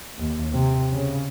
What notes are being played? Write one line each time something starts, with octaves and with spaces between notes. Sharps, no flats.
D#2
C3
C#3